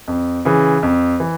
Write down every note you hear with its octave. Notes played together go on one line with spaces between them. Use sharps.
F2
C#3 E3
F2
E3